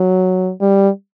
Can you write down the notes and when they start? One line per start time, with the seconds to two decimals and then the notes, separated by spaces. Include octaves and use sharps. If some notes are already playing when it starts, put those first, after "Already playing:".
Already playing: F#3
0.61 G3